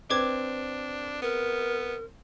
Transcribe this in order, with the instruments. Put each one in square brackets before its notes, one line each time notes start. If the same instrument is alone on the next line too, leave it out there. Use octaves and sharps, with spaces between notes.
[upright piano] C4 [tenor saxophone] D4 [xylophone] B4 D6 G#6
[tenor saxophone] B3 [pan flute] A#4